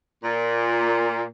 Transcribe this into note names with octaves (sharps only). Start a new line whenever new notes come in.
A#2